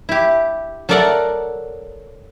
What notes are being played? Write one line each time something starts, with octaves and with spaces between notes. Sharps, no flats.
E4 G4
F#3 A4 A#4 D5 F5 F#5